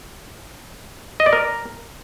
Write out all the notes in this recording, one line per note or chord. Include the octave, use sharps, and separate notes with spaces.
D#5
D5
A#4